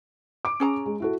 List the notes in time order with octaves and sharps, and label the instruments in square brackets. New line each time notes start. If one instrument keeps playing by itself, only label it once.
[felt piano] D6 D7
[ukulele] C#4 G#4 A#5
[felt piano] G#3
E4 F#4 A4